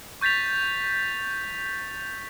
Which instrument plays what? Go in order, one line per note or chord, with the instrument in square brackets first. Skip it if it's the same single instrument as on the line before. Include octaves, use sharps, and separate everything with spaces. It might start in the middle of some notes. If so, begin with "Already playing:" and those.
[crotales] C#6 G6 A6 B6 F7